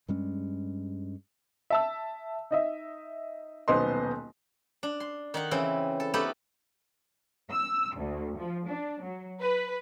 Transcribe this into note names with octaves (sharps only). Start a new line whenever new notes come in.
G2 G3 G#3 C#4
E5 A5 E6
D#4 D#5 E5
D#1 B1 B3 C5 D#5 C6
D4
C6
D#3 D#4 F#5
C#3 E3 C4 E4
A4
A3 B3 D#4 E4 G4 A4
E6
D2
F3
D4
F#3
B4